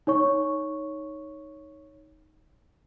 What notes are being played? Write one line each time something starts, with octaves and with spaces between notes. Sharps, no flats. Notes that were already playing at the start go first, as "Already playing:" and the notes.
D#4 C#5 C#6